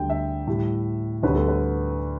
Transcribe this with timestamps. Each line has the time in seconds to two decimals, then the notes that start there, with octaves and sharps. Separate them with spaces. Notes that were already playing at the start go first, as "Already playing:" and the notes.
Already playing: D2 D3 G3 G5
0.10 E5
0.47 A2 G3
1.23 D2 D3 G3 B4
1.35 A4
1.48 B4